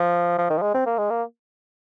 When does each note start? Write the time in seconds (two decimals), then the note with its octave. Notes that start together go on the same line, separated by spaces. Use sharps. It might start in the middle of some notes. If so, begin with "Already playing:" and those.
Already playing: F3
0.38 F3
0.50 D#3
0.58 F3
0.62 G#3
0.74 C4
0.86 A#3
0.98 G#3
1.10 A#3